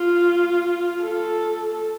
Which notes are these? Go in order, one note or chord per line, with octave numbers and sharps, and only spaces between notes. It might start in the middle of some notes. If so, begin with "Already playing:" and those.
Already playing: F4
A4